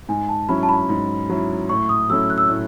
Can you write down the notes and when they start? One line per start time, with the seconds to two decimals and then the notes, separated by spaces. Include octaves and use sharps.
0.09 G#2 G#5
0.29 A5
0.49 F#3 C#4 E4 B5
0.63 A5
0.69 B5
0.89 G#2
1.29 F#3 C#4 E4
1.69 A2 C#6
1.89 D#6
2.10 F#3 A3 C#4 E4 E6
2.30 F#6
2.38 E6
2.46 A2 F#6